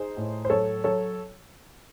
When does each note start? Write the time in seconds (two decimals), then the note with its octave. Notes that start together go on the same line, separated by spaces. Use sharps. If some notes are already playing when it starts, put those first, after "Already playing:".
Already playing: D#4 G#4 C5
0.17 A2
0.45 C5
0.50 F#3 A4 C#5
0.84 F#3 A4 C#5